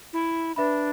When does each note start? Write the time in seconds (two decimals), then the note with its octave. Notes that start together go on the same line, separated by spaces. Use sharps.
0.13 E4
0.56 D4 B4 E5 B5